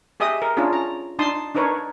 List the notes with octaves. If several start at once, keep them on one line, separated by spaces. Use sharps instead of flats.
G4 G#4 D#5 E5 D#6
A#4
C#4 D4 F4 G#4
A#5
D4 D#4 A5 C6 D#6
D4 D#4 A#4 B4 C#5